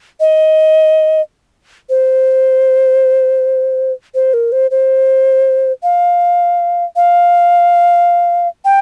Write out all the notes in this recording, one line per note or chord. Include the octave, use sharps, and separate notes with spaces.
D#5
C5
C5
A#4
C5
C5
F5
F5
G5